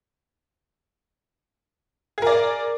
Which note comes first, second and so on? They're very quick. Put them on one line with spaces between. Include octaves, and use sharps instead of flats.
G#4 A#4 D5